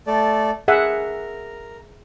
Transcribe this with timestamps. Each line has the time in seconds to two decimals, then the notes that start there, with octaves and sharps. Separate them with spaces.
0.07 A3 A4 D5
0.68 G#4 A#4 E5 F#5